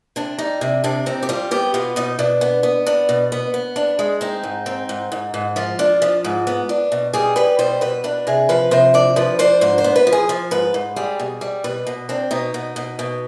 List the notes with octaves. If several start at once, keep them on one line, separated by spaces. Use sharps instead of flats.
C3 D4
G3 D#4
C3 D4
C3 D4
C4 D#4
G4
G3 F4
B3 G4
B2 F4
B2 D#4
B2 D4
B3
B3
D4
B2
B3
B3
D4
G#3
C4 D#4
G#2
C4
G#2
G#2
G#2
F3 F4
D4
F3
G#2
B3
D4
B2
G3 G#4
G3 B4
B2 C5
B2 B4
D4 B4
C3 G#4
F3 B4
C3 C5
D4 D5
F3 B4
D4 C5
G#2 C5
C5
B3
B4
F3
G#4
F3
G#2 B4
G#2
G3 G#4
B2
G3
B2 B4
B2
C4 D4
B2 D#4
B2
B2
B2